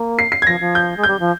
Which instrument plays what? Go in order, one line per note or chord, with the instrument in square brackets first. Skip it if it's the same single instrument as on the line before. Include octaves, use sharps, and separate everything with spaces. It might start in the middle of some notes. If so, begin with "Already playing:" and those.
Already playing: [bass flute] A#3
[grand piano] C7
C7
G#6
[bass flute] F3 [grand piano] A#6
[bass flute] F3
[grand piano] G6
[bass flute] G#3
[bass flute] G3 [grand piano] G6
[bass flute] F3